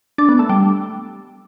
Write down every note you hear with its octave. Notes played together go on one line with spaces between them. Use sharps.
D4
B3
A3
G3